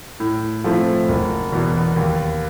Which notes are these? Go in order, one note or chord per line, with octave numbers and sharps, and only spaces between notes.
A2
F3 A3 C4 E4
F#1
E2 B2
D#2